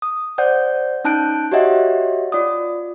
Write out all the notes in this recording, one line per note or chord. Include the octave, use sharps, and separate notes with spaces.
D#6
C5 D5 F#5 G6
C#4 D#4 A5 F#6 G6 D7
F#4 G4 C#5 D#5 E5 F#5
F4 D5 D#6